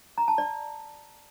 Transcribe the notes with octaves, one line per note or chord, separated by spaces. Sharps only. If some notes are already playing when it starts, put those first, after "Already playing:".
A#5
A5
D5